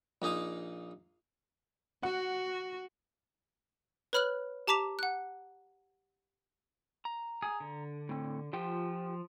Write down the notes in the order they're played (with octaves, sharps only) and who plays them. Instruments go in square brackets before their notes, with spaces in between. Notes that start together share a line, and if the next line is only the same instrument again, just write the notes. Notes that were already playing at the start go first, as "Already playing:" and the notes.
[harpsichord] A#1 A#3 D#4 G#4 F5
[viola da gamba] F#4 [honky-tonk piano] F#5
[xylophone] B4 C#5 B5 F6 F#6 F#7
G4 A5 A#5 D6 B6 F7
F#5 F#6
[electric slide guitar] A#5
[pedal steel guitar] G#4
D3
[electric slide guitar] A2 C4
[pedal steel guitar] F3 [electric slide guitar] F4 G4 G5